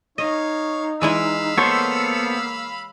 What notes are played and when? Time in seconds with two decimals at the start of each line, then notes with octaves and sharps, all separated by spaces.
0.18 D#4 C#5 D#5 F5
1.02 E3 G#3 E4 F5 B5 E6
1.58 A#3 B3 A4 C5 C#5